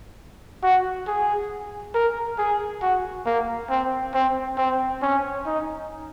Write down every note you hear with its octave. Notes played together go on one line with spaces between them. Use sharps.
F#4
G#4
A#4
G#4
F#4
A#3
C4
C4
C4
C#4
D#4